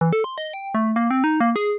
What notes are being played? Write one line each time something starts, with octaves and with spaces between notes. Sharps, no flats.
E3
A4
C6
D#5
G5
A3
A#3
C4
D#4
A#3
G#4